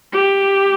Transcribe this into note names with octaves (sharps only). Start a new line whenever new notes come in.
G4